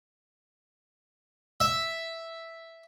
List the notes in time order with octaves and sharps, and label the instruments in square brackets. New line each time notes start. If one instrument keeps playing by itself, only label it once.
[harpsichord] E5